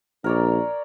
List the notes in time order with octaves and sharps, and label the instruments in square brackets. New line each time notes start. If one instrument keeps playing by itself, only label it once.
[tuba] A#1 [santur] A#4 C#5 D5